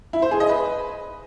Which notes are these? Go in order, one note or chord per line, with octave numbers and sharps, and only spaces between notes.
E4
C5
G#4
D#5
B4